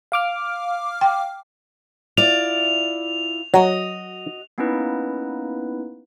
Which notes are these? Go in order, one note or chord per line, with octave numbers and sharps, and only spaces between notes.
F5 D6 F6
G5
E4 F4 D5 F7
F#3 F#4 D#5
A#3 B3 C#4 D#4 E4 B4